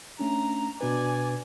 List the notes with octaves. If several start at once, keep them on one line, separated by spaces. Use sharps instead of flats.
A3 C#4 D4 A#5
B2 D4 B4 D5 G#5